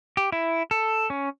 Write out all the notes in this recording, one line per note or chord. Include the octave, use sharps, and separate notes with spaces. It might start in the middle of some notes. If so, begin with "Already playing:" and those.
G4
E4
A4
C#4